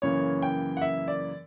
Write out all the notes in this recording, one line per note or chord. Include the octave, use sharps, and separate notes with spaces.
F#2 C#3 E3 A#3 C#5
G5
F#5
E5
D5